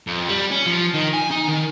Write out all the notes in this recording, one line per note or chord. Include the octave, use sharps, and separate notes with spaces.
F2
G3
C#4
F3
D#3
G#5
D#4
D#3